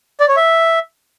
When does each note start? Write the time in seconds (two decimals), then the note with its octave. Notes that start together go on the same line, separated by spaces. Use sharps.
0.20 D5
0.28 C#5
0.37 E5